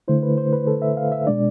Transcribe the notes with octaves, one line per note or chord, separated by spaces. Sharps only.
D3 A3 E4 C5
B4
C5
B4
A4
E5
F5
E5
B2 G#3 D4 D5